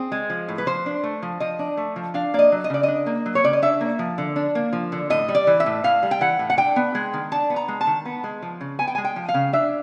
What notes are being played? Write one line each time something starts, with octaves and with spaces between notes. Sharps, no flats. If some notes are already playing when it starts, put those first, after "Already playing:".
Already playing: C4 G#4
G#3
F3
A2
B4
F3 C5
D4
A3
F3
F3 D#5
D4
A3
F3
D4 F5
A#3 D5
D#5
F#3
D#5
C#3 D5
D4 D#5
A#3
F#3
C#5
C#3 D5
D#5
D4 E5
A#3
F3
D3
D4
A#3
F3
D3
A2 D#5
G3
D5
E3
E5
A2
A2 F5
G3
G5
E3 F#5
A2
F#5
D4 G5
B3
G#3
D#3
D4 A5
B3
A#5
G#3
A5
D#3
B3
G#3
F3
C#3
B3 G#5
G5
G#3 G#5
G5
F3
F5
C#3
D4 E5